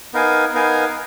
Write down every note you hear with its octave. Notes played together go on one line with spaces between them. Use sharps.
B3 D#4 A#4 F5 G#5
B3 D#4 A#4 F5 G#5